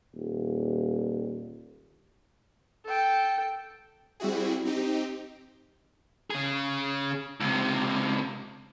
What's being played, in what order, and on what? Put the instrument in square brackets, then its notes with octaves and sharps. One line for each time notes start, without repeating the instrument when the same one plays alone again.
[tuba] D#1
[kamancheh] A4 G5
[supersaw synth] G3 C4 E4 F#4 G#4
C4 D#4 G4
[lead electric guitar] C#3 G#4
C#2 C3